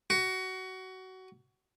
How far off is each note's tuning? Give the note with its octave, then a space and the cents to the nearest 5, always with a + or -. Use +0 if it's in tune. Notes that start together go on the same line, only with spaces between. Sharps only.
F#4 +20